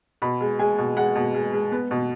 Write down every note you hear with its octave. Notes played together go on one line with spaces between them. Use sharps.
B2 B5
G#3
G#3 G#5
B2
G#3 F#5
B2
G#3
G#3
B3
B2